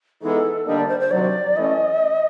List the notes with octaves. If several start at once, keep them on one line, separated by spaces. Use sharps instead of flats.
E3 G#3 B3 D#4 A4
D3 G3 A#3 D4 D#5
D5
C5
C5
C3 D#3 F#3 D5
E3 A3 C#4 D#5